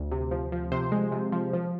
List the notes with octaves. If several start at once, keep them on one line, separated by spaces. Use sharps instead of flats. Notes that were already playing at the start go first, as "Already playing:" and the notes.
Already playing: D2
C3
F3
F3
C3 C5
G#3
C3
F3
F3